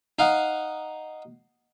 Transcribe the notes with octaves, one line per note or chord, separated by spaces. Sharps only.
D#4 F5 F#5